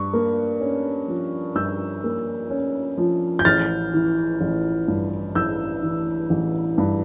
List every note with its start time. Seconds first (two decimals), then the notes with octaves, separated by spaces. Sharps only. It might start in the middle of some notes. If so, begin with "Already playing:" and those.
Already playing: G2 C#6
0.13 A#3
0.61 C#4
1.08 F3
1.55 G2 E6 G6
2.04 A#3
2.50 C#4
2.98 F3
3.39 G6
3.45 A1 F6 A6
3.94 E3
4.41 A1
4.88 G2
5.35 A1 E6 G6
5.82 E3
6.30 A1
6.78 G2